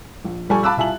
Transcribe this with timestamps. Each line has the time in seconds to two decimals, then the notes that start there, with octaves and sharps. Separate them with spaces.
0.25 A#1
0.49 A#1 G3 A4 G#5 C#6
0.63 F5 A5 B5 D6 E6 F#6
0.77 C2 F4 E5 G#5 A5 F#7